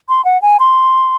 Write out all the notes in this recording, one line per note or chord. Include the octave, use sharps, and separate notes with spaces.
C6
F#5
G#5
C6